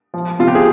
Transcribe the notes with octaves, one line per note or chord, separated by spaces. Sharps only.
F3
C3 F4
G4
G#4